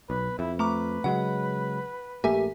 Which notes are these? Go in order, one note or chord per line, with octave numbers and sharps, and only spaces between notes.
B1 B4
F2 E4
A3 B4 A#5 D6
C#3 F#3 G#3 F#5
A#1 A3 A#3 G4 E5 G#5